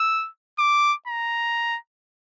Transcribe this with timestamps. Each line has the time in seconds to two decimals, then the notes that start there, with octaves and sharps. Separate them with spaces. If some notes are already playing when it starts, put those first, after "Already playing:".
Already playing: E6
0.59 D6
1.07 A#5